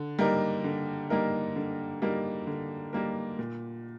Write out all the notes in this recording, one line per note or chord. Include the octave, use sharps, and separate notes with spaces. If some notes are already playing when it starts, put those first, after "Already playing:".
Already playing: D3
G3 A#3 D#4 A#4
D3
G3 A#3 D#4 A#4
D3
G3 A#3 D#4 A#4
D3
G3 A#3 D#4 A#4
A#2